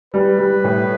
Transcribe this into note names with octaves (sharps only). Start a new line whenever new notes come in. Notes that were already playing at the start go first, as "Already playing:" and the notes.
G3 B4
G3
A2